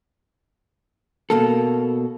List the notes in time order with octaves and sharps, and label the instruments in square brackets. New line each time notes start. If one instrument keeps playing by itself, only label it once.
[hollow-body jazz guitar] B2 A#3 A4